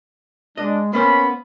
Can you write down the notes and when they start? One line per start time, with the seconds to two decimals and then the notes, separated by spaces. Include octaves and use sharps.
0.57 G#3 D4 D#5
0.93 A#3 B3 C#4 C5 B5